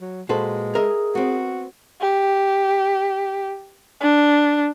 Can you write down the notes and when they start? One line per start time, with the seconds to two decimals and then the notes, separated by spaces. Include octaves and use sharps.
0.01 F#3
0.29 A#2 G#3 F#4 A4 B4 C5
0.75 G#4 A#4 D#5 E5
1.15 B3 C4 F#4
2.01 G4
4.00 D4